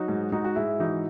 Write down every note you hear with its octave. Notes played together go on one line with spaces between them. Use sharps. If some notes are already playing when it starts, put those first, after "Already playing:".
Already playing: F#3 D#4 F#4
G#2
G#2 D#4 F#4
F#4
G#2 E4 G#4
E3 D#4 F#4